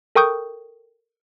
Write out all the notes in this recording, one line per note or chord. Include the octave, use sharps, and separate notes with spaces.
A4 A#4 G5 C#6 D#6 G6